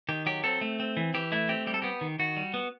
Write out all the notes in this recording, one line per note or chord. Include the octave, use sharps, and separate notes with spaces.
D#3 G4
F#3 G4
C4 A4
A3
C4
E3
E3 G4
A3 E4
C4 G4
G3 G4
A4
B3 G4
D#3
D#3 F#4
G3
B3